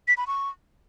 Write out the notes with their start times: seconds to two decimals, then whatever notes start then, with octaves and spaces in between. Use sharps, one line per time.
0.08 B6
0.17 B5
0.27 C#6